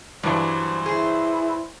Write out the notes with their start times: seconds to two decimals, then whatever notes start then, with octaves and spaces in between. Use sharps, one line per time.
0.23 G2 E3 F#3 G3 C5 A5
0.86 E4 G#4